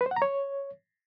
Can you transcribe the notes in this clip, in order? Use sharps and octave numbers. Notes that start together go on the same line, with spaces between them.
B4
C5
F#5
A#5
C#5